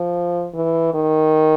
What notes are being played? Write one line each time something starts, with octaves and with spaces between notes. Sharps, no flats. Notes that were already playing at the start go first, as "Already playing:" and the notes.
Already playing: F3
E3
D#3